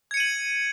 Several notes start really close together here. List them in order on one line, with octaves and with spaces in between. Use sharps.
G#6 C#7 D#7 F#7